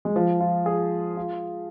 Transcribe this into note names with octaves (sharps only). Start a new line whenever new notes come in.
G#3
F3
F4
G#4
F4